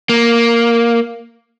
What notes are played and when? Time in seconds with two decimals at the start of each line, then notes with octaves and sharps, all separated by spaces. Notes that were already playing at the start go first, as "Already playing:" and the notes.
0.09 A#3